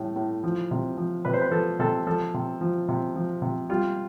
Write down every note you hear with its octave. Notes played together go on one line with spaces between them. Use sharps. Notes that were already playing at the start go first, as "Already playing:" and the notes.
Already playing: A2 G3
A2
F3
C3
F3
C3 B4
C5
B4
F3 A4
C3 A4
F3 A4
C3
F3
C3
F3
C3
G3 F4